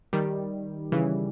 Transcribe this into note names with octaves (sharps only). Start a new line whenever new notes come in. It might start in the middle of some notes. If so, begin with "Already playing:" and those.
D#3 G3
C#3 E3